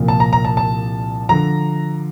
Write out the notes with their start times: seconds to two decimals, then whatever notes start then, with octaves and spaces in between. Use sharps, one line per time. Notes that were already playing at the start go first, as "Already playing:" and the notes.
Already playing: C2 A#2 F3
0.08 A5
0.20 A#5
0.33 A#5
0.45 A5
0.57 A5
1.29 D3 F3 A#5